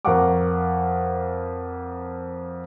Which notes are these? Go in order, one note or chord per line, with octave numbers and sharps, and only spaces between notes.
F2 A#4 F5 F#5 C#6 D6